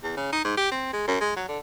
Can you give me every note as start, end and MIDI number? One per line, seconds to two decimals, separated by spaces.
0.03 0.13 40
0.17 0.31 49
0.33 0.42 63
0.44 0.56 44
0.57 0.71 67
0.72 0.89 60
0.93 1.06 56
1.07 1.16 42
1.21 1.34 56
1.36 1.44 54
1.49 1.58 50